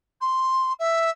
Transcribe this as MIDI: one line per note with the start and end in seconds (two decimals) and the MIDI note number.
0.21 0.73 84
0.79 1.10 76